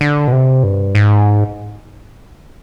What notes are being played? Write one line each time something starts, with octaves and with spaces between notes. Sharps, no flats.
D3
B2
C3
G2
G#2